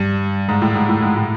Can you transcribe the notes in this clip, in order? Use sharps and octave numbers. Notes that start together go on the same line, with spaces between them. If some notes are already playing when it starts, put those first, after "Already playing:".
Already playing: G2
G#2
A2
G#2
A2
G#2
A2